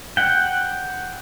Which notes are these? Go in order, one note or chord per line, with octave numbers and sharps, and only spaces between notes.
F#5 G5